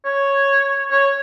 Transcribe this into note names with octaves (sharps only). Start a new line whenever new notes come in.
C#5
C#5